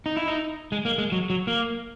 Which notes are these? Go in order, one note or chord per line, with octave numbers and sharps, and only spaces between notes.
D#4
E4
D#4
G#3
A#3
G#3
F#3
F#3
A#3